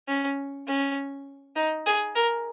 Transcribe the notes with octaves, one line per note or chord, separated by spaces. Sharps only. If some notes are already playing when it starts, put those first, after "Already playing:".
C#4
C#4
D#4
G#4
A#4